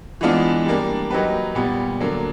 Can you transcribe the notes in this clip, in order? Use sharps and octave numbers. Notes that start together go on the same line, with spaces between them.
E3 G#3 B3 D4 F4
G3 A#3 D4
F#3 A#3 D#4 G4 B4
A#2 G3 B3
D3 F#3 A#3 D4